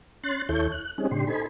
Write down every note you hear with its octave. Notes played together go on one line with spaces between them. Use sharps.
C#4 C6 F#6 A6
D#2 E4 A4 C#5 G6
F#6
G3 C4 C#4 D#4 G#4
A2 C#3 D4 G4 C6
D#4 A4 C5 G#5 B5